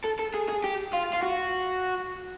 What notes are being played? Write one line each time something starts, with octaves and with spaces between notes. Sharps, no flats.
A4
A4
G#4
G#4
G4
F4
F4
F#4